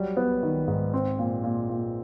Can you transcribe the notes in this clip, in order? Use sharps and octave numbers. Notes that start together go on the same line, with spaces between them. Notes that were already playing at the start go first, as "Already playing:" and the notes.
Already playing: F#3 G3
B3
D#3
G#2
C4
A#2
A#2
A#2